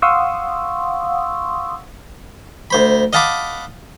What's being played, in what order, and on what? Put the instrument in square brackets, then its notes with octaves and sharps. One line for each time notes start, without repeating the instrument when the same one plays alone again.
[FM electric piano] F5 F#5 C6 C#6 D#6 E6
[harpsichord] D2 C5 B5
D#5 F5 F#5 A5 B5 D6